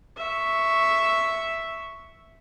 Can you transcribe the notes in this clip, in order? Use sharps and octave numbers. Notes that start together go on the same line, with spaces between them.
E5 C#6